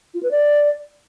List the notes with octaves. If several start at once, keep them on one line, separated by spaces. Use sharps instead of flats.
F4
B4
D5